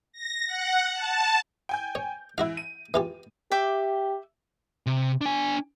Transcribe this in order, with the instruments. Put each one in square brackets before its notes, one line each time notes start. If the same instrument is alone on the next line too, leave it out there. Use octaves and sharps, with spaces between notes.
[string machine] A#6
F#5
A5
[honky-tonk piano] G5 G#5 G6
[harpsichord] C#5
[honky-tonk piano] E3 [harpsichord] E4 F#4 F5
[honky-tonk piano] D#7
[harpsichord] E3 F4 G4
[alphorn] G4 [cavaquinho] E5 G5 D6
[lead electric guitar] C3
D4 G#5